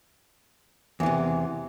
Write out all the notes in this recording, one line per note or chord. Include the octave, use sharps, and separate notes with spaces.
E2 C3 E3